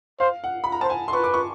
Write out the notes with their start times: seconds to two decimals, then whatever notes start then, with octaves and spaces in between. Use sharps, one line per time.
0.20 C5 F5
0.44 F#5
0.64 B5
0.72 A#5
0.81 C5 A5
0.90 G#5
1.08 C6
1.13 B4 C#6
1.24 D6
1.34 C#6